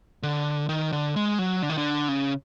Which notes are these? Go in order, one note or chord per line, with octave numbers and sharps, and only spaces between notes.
D3
D#3
D3
G#3
F#3
D3
D#3
D3
C#3